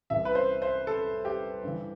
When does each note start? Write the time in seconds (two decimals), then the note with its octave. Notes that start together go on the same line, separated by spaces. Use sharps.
0.10 C2 C3 E3 E5
0.25 B4
0.35 C5
0.62 C5
0.87 A4
1.25 G4
1.63 G2 E3